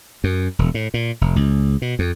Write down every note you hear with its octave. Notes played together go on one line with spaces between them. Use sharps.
F#2
E1
A2
A#2
F1
C#2
B2
F2